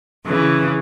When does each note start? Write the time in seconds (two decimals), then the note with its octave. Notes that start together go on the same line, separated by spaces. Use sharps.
0.24 C#3 E3